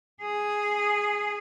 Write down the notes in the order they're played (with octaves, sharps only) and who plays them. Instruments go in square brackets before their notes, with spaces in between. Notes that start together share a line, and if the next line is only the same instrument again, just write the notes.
[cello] G#4